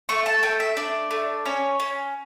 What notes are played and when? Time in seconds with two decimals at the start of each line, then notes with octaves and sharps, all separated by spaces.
0.09 A3 C#6
0.26 A5
0.43 A3 G5
0.60 E5
0.77 D4 D5
1.11 A3
1.45 C#4 C#5
1.80 C#4